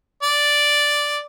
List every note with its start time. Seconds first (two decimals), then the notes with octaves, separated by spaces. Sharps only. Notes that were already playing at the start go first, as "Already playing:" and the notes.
0.23 D5